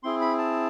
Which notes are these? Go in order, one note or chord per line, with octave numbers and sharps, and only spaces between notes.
C4 E4 G#4 C6
B5
A5